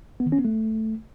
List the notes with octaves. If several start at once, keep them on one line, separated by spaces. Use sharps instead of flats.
B3
D#3
C#4
B3
A3